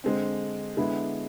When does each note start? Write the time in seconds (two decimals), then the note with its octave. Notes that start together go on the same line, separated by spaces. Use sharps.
0.04 D3 G#3 C4
0.77 D3 G#3 B3 E4